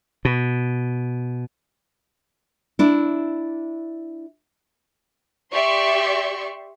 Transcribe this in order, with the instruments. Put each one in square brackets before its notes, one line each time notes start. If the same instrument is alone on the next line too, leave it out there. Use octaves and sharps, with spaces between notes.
[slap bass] B2
[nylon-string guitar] D4 E4
[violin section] G4 D5 E5 C6 C#6